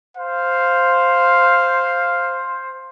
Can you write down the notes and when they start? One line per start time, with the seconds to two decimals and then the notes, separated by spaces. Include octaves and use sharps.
0.17 C5 F5